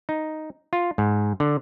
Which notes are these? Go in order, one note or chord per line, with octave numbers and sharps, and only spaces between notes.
D#4
F4
G#2
D3